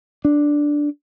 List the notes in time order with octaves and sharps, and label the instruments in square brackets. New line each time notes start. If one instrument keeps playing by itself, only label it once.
[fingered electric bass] D4